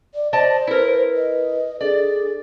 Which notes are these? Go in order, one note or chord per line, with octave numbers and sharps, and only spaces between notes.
D5
C5 D5 D#5 A5
E4 A#4 B4
D#5
D4 G#4 A4 D5